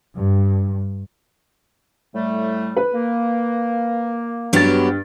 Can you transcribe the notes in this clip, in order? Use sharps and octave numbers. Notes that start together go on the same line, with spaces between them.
G2
A2 G3 A3
B4
A#3
G2 F#3 B3 G4 A6